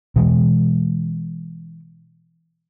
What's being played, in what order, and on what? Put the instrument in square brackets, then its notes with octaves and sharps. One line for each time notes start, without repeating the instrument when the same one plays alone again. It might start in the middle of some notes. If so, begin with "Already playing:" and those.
[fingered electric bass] B2 E3 G#3